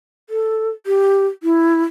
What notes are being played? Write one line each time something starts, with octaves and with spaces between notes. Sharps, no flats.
A4
G4
E4